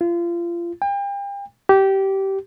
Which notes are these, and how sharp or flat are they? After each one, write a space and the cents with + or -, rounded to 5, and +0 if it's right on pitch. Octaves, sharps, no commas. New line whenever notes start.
F4 -30
G5 +40
G4 -20